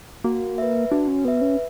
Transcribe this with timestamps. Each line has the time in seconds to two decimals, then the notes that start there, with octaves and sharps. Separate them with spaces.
0.24 A#3 F#4
0.58 B4 E5
0.91 D4 F#4
1.08 C#4
1.24 B3 B4 E5
1.41 C#4